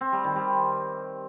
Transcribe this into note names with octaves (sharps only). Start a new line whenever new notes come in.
C4
G3
D#3
G3